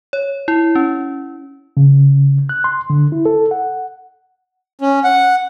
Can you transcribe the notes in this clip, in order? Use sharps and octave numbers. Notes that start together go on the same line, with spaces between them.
C#5
E4
C#4
C#3
F#6
C6
D3
E4
A4
F#5
C#4
F#5